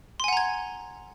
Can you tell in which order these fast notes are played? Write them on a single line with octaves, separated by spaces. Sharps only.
C6 G#5 F#5 A#5 G#6